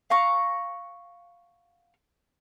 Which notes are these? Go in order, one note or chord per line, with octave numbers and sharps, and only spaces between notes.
F5 F#5 A#5 C#6